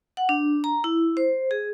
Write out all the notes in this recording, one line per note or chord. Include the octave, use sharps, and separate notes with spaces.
F#5
D4
A#5
E4
C5
G#4